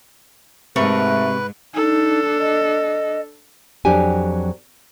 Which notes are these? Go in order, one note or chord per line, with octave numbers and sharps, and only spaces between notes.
G#2 C3 A3 A#4 B4 F#5 C#6 F#6
D4 D#4 A4
D#5
F2 F#3 D4 G4 G#5